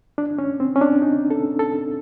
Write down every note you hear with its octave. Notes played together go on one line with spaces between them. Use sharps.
D4
C#4
C4
C#4
D4
D#4
A4
A4